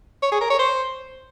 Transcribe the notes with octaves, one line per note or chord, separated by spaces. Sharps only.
C#5
G#4
A#4
C#5
C5